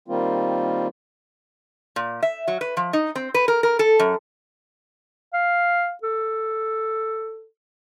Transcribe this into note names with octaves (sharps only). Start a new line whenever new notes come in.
D#3 G3 A#3 C4 F4
A#2
E5
F#3
B4
F3
D#4
C4
B4
A#4
A#4
A4
F#2
F5
A4